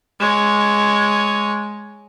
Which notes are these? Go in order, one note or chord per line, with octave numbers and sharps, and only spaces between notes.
G#3 C#5